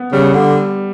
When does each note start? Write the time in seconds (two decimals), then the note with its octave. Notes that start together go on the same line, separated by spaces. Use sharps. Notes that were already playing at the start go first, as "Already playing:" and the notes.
Already playing: B3
0.12 C#3 G3
0.33 D3